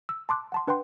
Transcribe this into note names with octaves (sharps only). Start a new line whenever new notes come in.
E6
A5 C6 D6 F#6
F#5 A5 C6
D4 B4 F#5 G5 C6